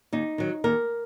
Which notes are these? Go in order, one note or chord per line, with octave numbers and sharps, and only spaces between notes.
D#2 D#4
D#3 F#3
D#2 A#4